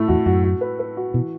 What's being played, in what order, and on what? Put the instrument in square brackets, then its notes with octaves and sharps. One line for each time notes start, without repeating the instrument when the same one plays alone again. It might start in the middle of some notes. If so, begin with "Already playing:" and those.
Already playing: [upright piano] A2 A3
[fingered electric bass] E2 [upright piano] F#4
[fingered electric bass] F#2 [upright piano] F#4
[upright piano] F#4
B4
B4
F#4
[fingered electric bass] B2 [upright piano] E3